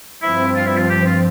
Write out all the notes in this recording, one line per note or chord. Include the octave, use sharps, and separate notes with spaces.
G2 F3 C4 E4
F4
E4
F4
G4
F4